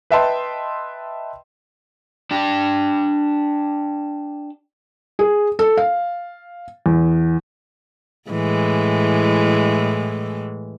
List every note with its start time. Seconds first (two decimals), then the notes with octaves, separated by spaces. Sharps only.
0.11 B4 D#5 E5 G5 A5 C6
2.31 D4 G4
5.19 G#4
5.59 A4
5.77 F5
6.86 E2
8.30 A2 E3 G#3